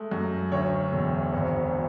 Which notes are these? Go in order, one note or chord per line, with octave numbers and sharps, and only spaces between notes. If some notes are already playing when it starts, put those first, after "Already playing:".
Already playing: G#3 A3
F#2
D2 C#5
E1
G#1